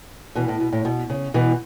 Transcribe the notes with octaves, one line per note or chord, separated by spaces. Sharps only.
B2 E3
A2
B2
A2
B2
C#3
B2 E3